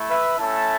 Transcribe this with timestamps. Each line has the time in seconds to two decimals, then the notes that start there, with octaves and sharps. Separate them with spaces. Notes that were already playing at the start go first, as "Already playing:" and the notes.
Already playing: A3 E4
0.09 B4 E5
0.38 A3 C#4 E4 E5 A5